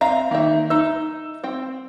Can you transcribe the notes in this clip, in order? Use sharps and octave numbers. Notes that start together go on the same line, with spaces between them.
C4 E5 F5 A#5
D#3 A#3 E5
D#4 E5 E6
C4 G5